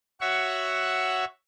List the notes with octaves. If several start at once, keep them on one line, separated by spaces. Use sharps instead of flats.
F#4 C#5 E5 F#5 C#6